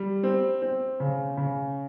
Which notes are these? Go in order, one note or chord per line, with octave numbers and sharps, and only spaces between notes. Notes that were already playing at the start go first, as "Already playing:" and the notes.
Already playing: G3
C4
C4
C#3
C#3